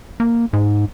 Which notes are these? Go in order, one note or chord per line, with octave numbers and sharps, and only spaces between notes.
A#3
G#2